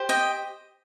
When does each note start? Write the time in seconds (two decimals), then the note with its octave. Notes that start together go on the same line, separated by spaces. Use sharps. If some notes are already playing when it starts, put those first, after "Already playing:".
Already playing: G4 C5
0.09 D#5 G5